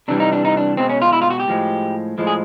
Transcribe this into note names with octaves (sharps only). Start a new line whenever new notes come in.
C3 E3 G3 D4
D#4
D4
D#4
D4
B2 G#3 C4
C#4
F4
E4
F4
F#4
G4
A2 F3 G#3
A2 F3 G#3
G#4